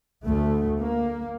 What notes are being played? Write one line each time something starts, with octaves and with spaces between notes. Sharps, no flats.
D2 A3
A#3